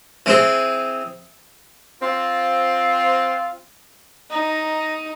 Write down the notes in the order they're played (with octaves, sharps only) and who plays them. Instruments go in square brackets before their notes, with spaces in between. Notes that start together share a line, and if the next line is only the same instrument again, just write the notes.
[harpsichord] E3 C4 G#4
[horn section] C4 F4
[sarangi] D#4 [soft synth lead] A#5